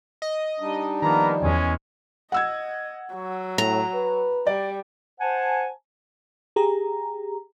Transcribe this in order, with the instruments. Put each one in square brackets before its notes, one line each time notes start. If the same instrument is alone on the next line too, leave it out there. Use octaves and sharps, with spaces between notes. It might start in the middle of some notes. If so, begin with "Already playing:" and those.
[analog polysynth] D#5
[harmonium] G3 D4 D#4
[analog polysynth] D#3 F3 [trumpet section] A#3 B3 A#5
[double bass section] E2 [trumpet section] G#3 C#4
[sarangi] D#5 [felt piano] F#5 E6 G#6
[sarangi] F#3
[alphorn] A2 [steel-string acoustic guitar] A#5
[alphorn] B4
[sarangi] G3 [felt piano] D5
[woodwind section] C5 F#5 G#5 A5
[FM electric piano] G4 G#4 A#5